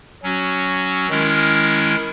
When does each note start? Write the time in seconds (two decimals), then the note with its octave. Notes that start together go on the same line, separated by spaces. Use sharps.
0.22 F#3 C#4 F#4
1.09 D#3 G#3 C#4 E4 A#4